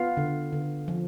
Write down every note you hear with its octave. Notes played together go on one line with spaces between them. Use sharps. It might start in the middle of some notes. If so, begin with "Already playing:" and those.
Already playing: B3 F4 F5
D3
D3
F3